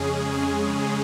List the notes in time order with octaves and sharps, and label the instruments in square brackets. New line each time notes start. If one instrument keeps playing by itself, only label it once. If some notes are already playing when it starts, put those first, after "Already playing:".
Already playing: [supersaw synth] F2 C#3 G#3 C#4 G#4
G#4